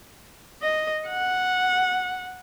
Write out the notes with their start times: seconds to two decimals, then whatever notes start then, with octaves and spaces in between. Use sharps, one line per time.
0.62 D#5
1.07 F#5